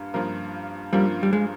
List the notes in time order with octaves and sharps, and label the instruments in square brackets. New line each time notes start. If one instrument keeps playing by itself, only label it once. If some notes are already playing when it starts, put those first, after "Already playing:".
Already playing: [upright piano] G2 A#3 F4
G2 F3 A#3 F4 A#4
[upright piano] G2 F3 A#3 F4 A#4 [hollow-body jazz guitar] G3
[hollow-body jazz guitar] G3
G#3